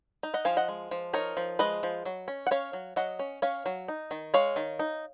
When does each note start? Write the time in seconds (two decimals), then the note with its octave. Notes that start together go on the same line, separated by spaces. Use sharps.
0.23 D#4
0.34 D#5 F#5
0.45 F3 F5 G#5
0.57 D#5 F#5
0.68 G#3
0.91 F3
1.13 D#4 A#4 C#5
1.37 F3
1.59 G#3 B4 D#5
1.83 F3
2.05 F#3
2.28 C#4
2.47 F#5
2.51 C#4 C#5 F5
2.73 F#3
2.96 F#3 D#5 F#5
3.19 C#4
3.42 C#4 C#5 F5
3.66 F#3
3.88 D#4
4.11 D#3
4.34 G#3 C#5 F5
4.56 D#3
4.79 D#4